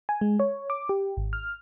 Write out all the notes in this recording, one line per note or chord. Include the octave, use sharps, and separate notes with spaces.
G#5
G#3
C#5
D6
G4
G#1
F6